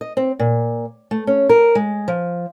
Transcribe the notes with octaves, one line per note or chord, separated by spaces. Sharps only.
D#5
C4
A#2
A3
C#4
A#4
G#3
F3